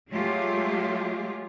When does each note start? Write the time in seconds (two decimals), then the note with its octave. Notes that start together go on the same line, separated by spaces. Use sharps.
0.12 F#3 G#3 A3 F4 G4 G#4